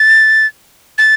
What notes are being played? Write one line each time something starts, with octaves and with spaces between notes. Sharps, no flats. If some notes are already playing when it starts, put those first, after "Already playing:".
Already playing: A6
A6